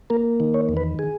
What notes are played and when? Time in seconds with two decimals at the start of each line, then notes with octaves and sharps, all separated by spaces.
0.10 A#3 A#4
0.40 D#3
0.54 C#5
0.69 E2
0.77 B4
0.99 G#4